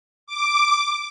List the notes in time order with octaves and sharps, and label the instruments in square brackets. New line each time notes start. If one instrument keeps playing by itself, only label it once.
[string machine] D6